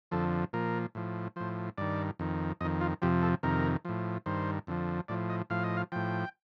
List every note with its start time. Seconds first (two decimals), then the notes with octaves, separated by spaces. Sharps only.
0.11 F2 D3 F3 A4
0.53 A#2 F3 A#4
0.95 A2 F3
1.36 A2 F3 C5
1.78 G2 D#3 D5
2.19 F2 D#3
2.61 F2 D#3 D#5
2.81 F4
3.02 F2 C3 F3 G4
3.23 A4
3.43 F2 C3 D#3 A#4
3.85 A2 F3
4.26 G2 D#3 C5
4.67 F2 D3 F3
5.08 A2 F3 D5
5.30 D#5
5.50 A2 F3 F5
5.64 D#5
5.77 F5
5.92 A2 F3 G5